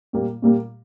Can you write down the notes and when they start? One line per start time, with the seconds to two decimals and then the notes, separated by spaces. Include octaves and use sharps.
0.13 A#2 G3 A#3
0.42 A#2 G3 A#3